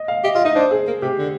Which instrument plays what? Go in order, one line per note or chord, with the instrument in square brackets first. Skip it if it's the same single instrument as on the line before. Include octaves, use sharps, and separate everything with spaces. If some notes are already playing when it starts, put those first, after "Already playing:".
Already playing: [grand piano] D#5
F5
[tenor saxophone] G4 [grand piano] D#5
[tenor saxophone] F4 [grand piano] D#5
[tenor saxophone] D#4 [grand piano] D#5
[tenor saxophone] D4 [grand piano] C5
[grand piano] G#4
[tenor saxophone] A#3
[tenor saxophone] C3 [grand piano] G4
[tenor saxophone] D3